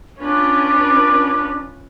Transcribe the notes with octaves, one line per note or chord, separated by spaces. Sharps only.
C#4 D4 F4 B4